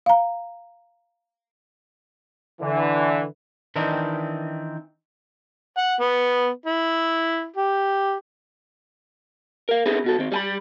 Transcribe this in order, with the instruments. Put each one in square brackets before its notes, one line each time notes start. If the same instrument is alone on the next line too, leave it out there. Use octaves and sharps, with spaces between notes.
[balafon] F5 A#5
[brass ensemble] D3 E3
[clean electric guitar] D#3 E3 C4 D4 D#4
[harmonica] F#5
B3
E4
G4
[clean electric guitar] A#4 F5
B3 C4 D#4 E4 G#4 A4
B2 F#4 A4
D#3 C4
G3 G#5 B5